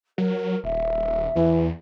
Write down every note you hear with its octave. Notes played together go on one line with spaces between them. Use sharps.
F#3 A#4
D#1 E5
E2 E3